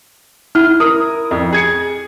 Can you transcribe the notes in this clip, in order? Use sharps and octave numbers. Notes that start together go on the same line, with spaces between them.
E4 F6
A#4 D#6
F2
G#4 G#6 C#7